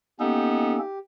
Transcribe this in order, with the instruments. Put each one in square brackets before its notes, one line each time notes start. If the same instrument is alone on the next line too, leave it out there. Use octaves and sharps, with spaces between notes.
[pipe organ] A#3 C#4 A4 [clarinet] B3 [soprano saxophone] D#4 [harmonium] G4